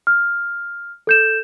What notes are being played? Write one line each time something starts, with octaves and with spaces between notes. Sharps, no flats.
F6
A4 G6 E7